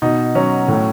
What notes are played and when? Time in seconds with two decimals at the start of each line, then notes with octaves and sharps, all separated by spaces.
0.02 B2 D#4
0.35 F#3 C#4
0.68 A2